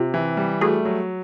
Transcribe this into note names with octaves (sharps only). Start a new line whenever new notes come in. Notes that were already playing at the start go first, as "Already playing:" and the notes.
Already playing: C3 F4 G4
E3
G3
A3 F#4 G#4
F#3